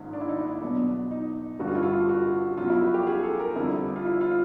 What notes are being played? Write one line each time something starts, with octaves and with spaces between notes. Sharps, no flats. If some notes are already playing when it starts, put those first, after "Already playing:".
Already playing: A#1 G#2 D#3 C#4
D4
E4
D#4
E4
E2 B2 F#3 D4
D#4
A1 G2 D3 G3 F#4
F4
E4
F4
F#4
E2 C#3 F#3 F4
E4
F#4
G4
G#4
A4
A#4
F2 D3 G3 E4
F4
E4
F4